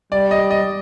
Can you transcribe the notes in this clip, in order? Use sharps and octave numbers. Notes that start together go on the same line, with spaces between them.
G3 D5
D#5
D#5